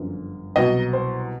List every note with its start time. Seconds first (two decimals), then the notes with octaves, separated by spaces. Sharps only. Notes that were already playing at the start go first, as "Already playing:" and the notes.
Already playing: G1 F#2 D3 F3
0.56 C2 B2 F#3 D#5
0.93 C5